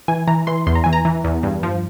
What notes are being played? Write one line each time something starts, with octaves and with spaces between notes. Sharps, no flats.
E3 G#5
E3 A#5
E3 C6
E2 C6
A#5
E3 G#5
A#5
E3
E2
G2
F3